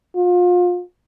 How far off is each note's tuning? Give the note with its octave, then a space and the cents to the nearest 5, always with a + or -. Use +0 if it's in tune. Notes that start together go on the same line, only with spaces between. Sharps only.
F4 +30